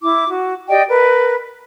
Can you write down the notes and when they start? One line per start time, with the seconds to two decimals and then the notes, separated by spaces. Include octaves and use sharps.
0.02 E4 D6
0.29 F#4
0.68 G4 D5 D#5 G5
0.88 A#4 B4